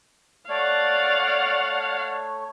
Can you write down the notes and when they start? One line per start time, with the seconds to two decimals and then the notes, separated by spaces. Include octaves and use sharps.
0.48 A3 C#5 D5 F5 F#5